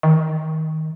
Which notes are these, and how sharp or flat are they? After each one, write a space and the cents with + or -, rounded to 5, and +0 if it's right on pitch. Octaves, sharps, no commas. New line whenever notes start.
D#3 +20